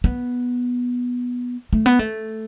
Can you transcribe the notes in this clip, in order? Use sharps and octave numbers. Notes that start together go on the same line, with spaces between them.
B3
A3
B3
A3